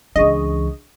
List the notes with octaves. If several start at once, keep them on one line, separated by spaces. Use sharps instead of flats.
C#2 E3 D4 G#4 D#5 C#6